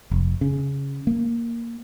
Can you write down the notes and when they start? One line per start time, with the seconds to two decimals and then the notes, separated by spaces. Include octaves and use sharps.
0.11 F1
0.41 C#3
1.07 A#3